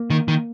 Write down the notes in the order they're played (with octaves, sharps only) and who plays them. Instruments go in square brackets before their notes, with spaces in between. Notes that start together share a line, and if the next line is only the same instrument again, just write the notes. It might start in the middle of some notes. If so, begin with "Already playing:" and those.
Already playing: [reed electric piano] A#3
[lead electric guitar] D#3
D#3